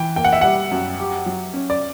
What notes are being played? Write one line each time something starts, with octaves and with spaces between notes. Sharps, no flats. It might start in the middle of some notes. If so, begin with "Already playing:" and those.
Already playing: E3 G5
A#3 G5
F#5
E5
G3 F#5
F#2
G4
F#3
C#4
D5